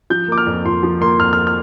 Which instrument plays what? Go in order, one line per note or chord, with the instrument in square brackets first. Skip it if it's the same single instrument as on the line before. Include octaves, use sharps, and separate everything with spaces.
[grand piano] F3 G6
A#3 D6
F6
F2
F2 C6
F3
A#3 C6
F2 F6
F6
F6